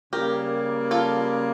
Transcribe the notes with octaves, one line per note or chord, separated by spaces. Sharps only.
C#3 G3 A#3 G4 A#4
F4 A4